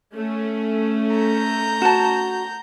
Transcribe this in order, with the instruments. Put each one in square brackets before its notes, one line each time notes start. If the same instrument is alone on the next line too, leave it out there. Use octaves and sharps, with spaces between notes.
[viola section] A3 C#4
[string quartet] A#5 G6
[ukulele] F#4 A5